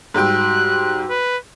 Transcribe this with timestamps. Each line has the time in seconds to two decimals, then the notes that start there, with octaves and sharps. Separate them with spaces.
0.14 G#2 G3 F#4 G5 E6 F#6
1.10 B4